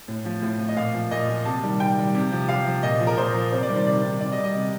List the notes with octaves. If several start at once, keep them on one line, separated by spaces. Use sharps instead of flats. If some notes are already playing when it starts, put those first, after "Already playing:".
A2
F3
A2
F3
D#5
A#2 F5
F3
A#2 D#5
F3
C3 A5
D#3 G3
C3 G5
D#3 G3
C3
F3
C3 F5
F3
A#2 D#5
F3
A#4
A#2 C5
F3
C3 C5
D5
D#3 G3 C5
C3 D5
D#3 G3
C3 D5
D#5
G3
D#5
C3